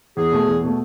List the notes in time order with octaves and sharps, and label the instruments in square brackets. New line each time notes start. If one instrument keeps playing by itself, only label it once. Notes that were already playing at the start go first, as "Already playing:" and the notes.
[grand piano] E2 [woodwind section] G#4
[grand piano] B2 A3
E2
B2 A3